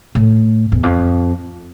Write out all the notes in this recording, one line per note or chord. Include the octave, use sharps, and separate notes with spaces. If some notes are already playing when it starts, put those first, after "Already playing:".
A2
E2
F2